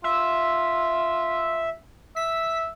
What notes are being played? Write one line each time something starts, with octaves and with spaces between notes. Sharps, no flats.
F4 E5
E5 B6